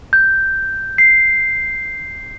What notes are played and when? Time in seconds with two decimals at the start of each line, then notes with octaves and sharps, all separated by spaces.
0.13 G6
0.98 C7